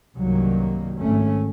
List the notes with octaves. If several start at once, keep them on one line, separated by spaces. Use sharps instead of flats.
C2 G2 D#3 F#3 G3 A#3
G#1 A3 C#4